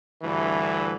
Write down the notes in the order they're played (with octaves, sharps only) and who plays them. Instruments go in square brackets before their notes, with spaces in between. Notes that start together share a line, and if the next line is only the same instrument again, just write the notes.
[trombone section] D2 G2 E3